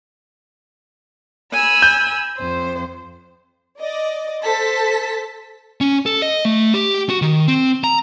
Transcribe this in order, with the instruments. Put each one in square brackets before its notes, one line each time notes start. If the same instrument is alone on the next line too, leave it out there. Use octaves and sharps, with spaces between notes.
[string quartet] G#5 B5 E6
[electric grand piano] G6
[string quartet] F2 C5
[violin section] D5 D#5
A4 C5 A5 B6
[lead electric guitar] C#4
A4
D#5
A3
G4
F#4
D#3
C4
A#5